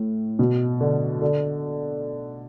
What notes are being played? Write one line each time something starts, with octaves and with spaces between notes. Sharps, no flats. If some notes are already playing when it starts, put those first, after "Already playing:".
Already playing: A2
B2
D3
D3